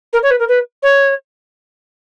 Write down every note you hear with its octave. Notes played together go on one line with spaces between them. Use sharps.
A#4
C#5
B4
A#4
B4
C#5